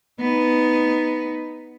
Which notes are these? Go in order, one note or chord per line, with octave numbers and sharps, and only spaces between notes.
B3 D#4